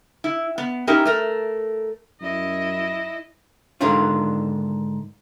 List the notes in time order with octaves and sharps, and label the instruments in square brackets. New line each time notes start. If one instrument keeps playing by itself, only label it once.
[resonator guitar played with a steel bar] E4
B3
C#4 D#4 E4 G4 A#4
A3 A#4
[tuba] F#2 [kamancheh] E4 D#5
[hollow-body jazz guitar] G#2 D3 D#3 D4 F4